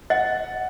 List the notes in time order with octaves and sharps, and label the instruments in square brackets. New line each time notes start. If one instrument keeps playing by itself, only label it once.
[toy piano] D#5 [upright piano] F#5